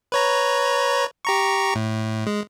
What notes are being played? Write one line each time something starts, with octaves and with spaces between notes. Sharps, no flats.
B4 C#5 A#5
G4 A#5 C#6
A2
G#3